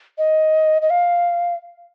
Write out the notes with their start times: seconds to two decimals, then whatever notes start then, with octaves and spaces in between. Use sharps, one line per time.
0.18 D#5
0.82 D#5
0.90 F5